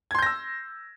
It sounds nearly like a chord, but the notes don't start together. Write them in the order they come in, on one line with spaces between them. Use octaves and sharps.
G#6 C6 G6 A#6 E6